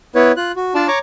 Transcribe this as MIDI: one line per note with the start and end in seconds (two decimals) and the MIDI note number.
0.15 0.32 59
0.15 0.32 64
0.15 0.32 71
0.15 0.32 73
0.37 0.52 65
0.37 0.52 90
0.56 0.74 66
0.75 0.87 62
0.75 0.87 65
0.75 0.87 74
0.75 0.87 81
0.88 0.99 73
0.88 0.99 82
0.88 0.99 85
0.88 0.99 86